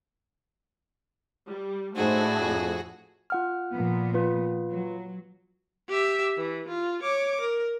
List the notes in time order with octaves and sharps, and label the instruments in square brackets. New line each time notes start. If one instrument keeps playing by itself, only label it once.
[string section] G3
[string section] A2 A3 D4 [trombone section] D#4 C5 [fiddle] F#4 G#4
[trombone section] F2
[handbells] F4 F#5 F6
[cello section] A#2 F3 B3
[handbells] F4 B4
[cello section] F#3
[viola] G4 E5
E3
F4
C#5 D6
A#4